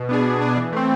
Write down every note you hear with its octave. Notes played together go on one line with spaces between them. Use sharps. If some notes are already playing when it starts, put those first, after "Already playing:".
Already playing: B2
B3 D4 G#4
B2
B3 D4 G#4
E3
A3 C4